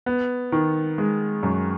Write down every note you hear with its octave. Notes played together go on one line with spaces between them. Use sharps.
B3
D#3
G#3
F#2